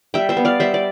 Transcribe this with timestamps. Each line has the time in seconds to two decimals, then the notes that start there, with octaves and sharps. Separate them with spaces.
0.14 G3 E5 G5
0.29 C5 E5
0.37 B3
0.45 D5 F5
0.60 G3 C5 E5
0.74 D5